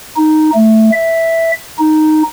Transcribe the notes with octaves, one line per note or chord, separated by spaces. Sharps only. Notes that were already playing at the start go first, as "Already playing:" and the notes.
D#4
A3
E5
D#4